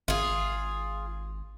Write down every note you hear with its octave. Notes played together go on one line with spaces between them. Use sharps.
G#1 F4 G#4